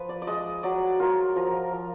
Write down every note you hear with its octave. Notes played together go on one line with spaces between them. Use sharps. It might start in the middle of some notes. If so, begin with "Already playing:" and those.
Already playing: F3 B4
D5
D5
G#3 D#5
F#3 D5
F4 A#4
F3 A#4
F3